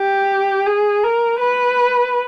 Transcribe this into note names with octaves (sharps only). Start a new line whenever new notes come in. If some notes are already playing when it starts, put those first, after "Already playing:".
Already playing: G4
G#4
A#4
B4